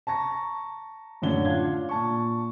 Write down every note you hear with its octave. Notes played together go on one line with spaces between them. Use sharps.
A5 A#5 C#6 A#6
F#2 A2 D3 C#4 C#5 G7
D4 F4 G#6
A#2 A5 C#6